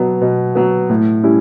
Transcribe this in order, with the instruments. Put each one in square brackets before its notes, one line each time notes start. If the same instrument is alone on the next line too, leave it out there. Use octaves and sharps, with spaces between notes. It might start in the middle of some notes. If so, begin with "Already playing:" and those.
Already playing: [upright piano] B2 F#3 B3
B2
F#3 B3
A2
G3 C#4 E4